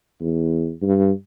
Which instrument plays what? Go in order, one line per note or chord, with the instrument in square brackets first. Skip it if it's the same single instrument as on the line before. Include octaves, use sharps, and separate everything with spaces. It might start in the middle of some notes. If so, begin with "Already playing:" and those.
[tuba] E2
G2